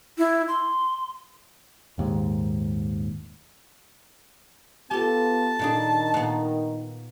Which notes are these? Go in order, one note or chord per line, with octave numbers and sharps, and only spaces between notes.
E4
C6
D#1 D#2 G#2
B3 F4 G4 A4 A5
A#2 D#3 D4 D#4 G#4
A#2 B3